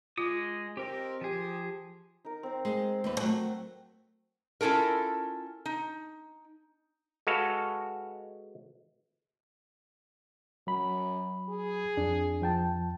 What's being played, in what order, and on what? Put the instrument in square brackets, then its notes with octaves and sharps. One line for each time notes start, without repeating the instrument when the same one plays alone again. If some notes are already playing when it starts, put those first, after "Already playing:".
[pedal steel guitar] G#3 D#6 [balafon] F4
[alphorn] C4 [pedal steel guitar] G4 A#4 D#5
[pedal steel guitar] F3 G#4 [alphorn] G4
[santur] D#4 A#4
C4 C5
[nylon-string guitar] G#3
D#2 B4
F#3 A3 F#5
[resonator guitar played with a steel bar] C#4 E4 F4 A4 A#4
D#4
[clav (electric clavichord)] G#3 F#4 A4 B4 F5
[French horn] F#2 [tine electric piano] F#3 B5
[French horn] G#4
[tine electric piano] F2 [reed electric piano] D4
[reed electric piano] F3 G5 A5